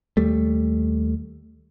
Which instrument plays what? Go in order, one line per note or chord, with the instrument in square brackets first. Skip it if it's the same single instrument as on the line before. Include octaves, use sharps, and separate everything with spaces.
[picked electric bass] D#2 G3 A3